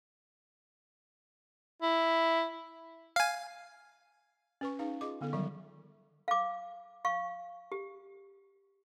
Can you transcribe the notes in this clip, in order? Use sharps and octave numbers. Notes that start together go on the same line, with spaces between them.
E4
F5 G#5
C#4 B4 C#6
D#4 G#4 B4 F5
F4 G#4 D#5 D6
D3 B3 A4
D#3 F#3 G3 E5
F5 D6
F5 C#6
G4